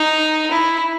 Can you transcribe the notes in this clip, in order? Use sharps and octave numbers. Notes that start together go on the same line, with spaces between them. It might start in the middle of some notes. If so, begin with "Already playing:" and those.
Already playing: D#4
E4